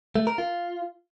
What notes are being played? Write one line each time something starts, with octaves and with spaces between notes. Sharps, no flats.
A3
A#4
F4